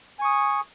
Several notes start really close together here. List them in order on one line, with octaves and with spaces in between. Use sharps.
G#5 C#6 D#6